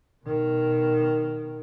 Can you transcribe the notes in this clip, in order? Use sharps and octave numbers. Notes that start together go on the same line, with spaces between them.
B2 D#3